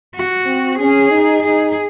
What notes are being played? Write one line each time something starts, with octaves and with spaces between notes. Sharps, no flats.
F#4
C4
C#4 G#4
D#4
D#4 G#4